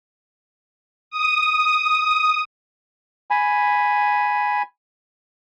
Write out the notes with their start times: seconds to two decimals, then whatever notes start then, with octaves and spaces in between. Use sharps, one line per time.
1.11 D#6
3.31 G#5 B5